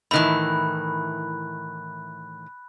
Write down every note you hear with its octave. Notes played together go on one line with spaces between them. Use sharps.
A2 D#3 E3 B5 F#6